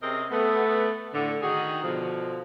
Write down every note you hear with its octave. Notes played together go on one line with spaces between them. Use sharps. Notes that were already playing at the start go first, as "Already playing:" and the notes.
C3 C4 C#4 G#4 A#4 D#5
A3 B3
A2 D3
D#3 F#4 G#4
B2 D3 F3